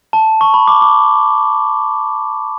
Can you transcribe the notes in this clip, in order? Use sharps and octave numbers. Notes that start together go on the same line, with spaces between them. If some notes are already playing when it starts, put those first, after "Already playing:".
A5
C#6
B5
D6
D6